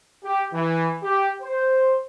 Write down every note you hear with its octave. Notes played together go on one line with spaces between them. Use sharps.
G4
E3
G4
C5